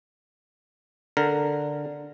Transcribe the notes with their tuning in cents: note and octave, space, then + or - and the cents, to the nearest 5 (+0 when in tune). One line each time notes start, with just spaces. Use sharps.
D3 +0 A#4 -10